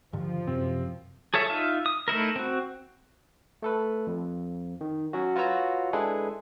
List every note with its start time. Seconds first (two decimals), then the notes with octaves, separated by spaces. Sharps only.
0.13 G2 D3 D#3 F3
0.47 F#2 C3 C4
1.34 G#4 A4 C#5 E5
1.50 D#4 F4 E5
1.86 D#6
2.08 A3 D#4 E4 A#4
2.36 C4 F#4
3.62 A3 A4 B4
4.07 F2
4.81 D#3
5.13 F#3 C#4 F#4
5.36 F4 F#4 B4 C#5 A#5 E6
5.93 G#3 D4 E4 G#4 A4 B4